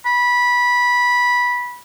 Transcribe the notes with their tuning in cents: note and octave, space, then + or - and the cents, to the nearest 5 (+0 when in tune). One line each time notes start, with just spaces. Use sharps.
B5 -15